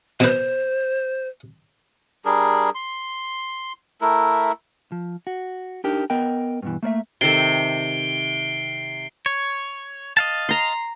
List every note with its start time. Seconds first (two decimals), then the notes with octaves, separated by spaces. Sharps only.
0.20 B2 B4 C5
2.25 G3 D4 G#4 A#4
2.75 C6
4.01 A3 E4 A#4
4.92 F3
5.27 F#4
5.84 D4 D#4 G4 A#4
6.10 B3 A#4 D#5 G5
6.62 G2 B2 E3
6.83 A3 A#3 D5 E5
7.21 C3 D#3 A4 C7 D7 G7
9.26 C#5
10.17 D#5 F5 A5
10.49 A#5 C6